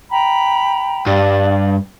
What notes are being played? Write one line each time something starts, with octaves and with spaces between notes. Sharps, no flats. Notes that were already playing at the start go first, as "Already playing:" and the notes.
G5 A#5 B5
G2 D5 F5